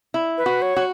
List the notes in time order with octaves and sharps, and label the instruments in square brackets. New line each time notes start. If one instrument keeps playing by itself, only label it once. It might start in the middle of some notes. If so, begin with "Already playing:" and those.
[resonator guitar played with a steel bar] E4
[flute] B4
[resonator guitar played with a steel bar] F#4
[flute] C#5
[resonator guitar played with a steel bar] F#4